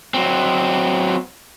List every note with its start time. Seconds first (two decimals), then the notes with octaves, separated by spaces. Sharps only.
0.14 F#3 C4